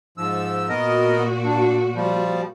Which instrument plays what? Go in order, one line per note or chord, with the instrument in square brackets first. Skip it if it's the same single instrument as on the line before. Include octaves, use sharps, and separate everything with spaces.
[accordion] G#2 F3 E6
[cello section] A#2 F#4 [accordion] B3 A#4 D#5
[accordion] D4
F3 G3